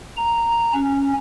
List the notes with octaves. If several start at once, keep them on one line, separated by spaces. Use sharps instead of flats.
A#5
C#4